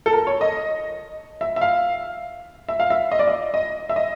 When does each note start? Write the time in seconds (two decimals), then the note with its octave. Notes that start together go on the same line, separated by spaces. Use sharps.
0.06 A4
0.13 A#4
0.27 C#5
0.41 D#5
1.41 E5
1.56 E5
1.61 F5
2.69 E5
2.80 F5
2.90 E5
3.12 D#5
3.19 D5
3.27 D#5
3.54 D#5
3.89 E5
3.96 D#5